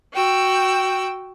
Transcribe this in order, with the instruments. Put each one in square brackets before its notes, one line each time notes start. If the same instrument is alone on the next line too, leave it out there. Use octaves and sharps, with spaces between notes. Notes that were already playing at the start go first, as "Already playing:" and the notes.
[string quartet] F#4 G5 E6